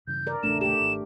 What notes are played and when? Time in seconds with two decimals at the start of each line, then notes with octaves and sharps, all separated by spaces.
0.07 G2 C#3 E3 G6
0.27 A#4 D5
0.43 A#1 E2 C#3 A3 D4 E7
0.61 A3 G4 E7
0.80 G#1